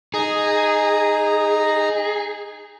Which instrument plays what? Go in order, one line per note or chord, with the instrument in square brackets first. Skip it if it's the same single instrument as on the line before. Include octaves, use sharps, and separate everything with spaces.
[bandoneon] D#4 A#5 [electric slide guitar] G#4